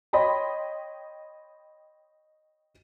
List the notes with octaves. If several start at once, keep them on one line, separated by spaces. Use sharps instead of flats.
C#5 D#5 G5 B5 C6